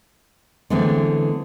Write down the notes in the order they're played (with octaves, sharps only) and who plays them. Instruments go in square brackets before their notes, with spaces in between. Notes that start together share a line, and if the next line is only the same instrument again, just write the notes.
[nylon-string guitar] D3 E3 G#3 A3 B3 C4